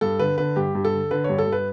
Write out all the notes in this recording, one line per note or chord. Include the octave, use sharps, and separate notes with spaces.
G2 A4
D3 B4
D3 B4
G2 G4
G2
A4
D3
D3 B4
C#5
G2
A4
G2 B4